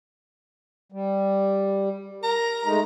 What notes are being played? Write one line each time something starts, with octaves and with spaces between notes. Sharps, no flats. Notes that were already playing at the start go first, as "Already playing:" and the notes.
G3
A#4 A#5
G#3 A3 D#4